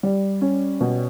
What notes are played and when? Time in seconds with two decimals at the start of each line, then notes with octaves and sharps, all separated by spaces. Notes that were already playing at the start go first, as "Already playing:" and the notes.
0.03 G3
0.41 C#4
0.81 B2